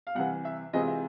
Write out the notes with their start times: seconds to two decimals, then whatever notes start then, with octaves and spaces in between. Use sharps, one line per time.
0.07 F5
0.15 C2 C3 E3 F#5
0.45 E5
0.73 C3 E3 G#3 C4 F4 D#5
0.88 E5